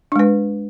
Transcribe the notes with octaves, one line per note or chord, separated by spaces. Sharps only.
G#3 D4 B4